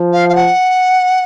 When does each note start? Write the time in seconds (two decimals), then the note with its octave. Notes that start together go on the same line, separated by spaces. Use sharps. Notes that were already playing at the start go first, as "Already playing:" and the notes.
Already playing: F3
0.12 F5
0.29 F5
0.35 F#5